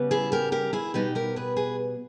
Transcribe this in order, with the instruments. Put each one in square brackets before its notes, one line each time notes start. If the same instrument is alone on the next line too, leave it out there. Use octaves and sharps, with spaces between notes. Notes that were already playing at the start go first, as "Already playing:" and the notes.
Already playing: [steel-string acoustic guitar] C#3 G3 B3
E4 G#4
G4 A#4
G4 A#4
E4 G#4
B2 G3 B3 D#4 G4
G4 A#4
G#4 B4
G#4 B4